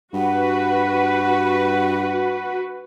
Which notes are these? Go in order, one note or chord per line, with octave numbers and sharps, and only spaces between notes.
G2 F#4 B4 F#5